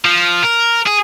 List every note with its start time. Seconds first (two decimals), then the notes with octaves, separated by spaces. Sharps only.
0.05 F3
0.43 A#4
0.86 G#4